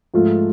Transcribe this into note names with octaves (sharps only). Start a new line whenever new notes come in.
G#2 F3 A3 F4